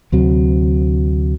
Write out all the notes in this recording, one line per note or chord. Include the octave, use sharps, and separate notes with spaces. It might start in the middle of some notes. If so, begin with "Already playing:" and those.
D2 C3 F#3